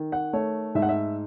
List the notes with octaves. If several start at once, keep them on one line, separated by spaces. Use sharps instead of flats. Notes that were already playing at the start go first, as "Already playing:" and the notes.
Already playing: D#3
F#5
A3 C#5
G#2 E5
F#5
E5